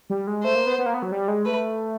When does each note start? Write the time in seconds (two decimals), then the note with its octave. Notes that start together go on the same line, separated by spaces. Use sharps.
0.10 G3
0.27 G#3
0.44 A3 C5
0.55 A#3
0.66 B3
0.78 B3
0.86 A#3
0.94 B3
1.02 F#3
1.12 G3
1.28 G#3
1.45 A3 B4